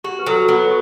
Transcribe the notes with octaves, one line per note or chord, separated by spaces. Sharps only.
F#4 G4
B4
F#3 A4
B4
B3 A4